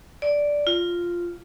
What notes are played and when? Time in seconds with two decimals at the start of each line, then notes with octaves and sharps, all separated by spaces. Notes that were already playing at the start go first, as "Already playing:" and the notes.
0.22 D5
0.67 F4